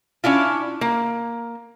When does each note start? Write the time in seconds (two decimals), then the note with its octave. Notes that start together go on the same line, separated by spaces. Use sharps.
0.24 C#4 D4 E4 F4
0.81 A#3